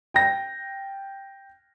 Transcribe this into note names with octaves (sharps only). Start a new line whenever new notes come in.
G5 A#6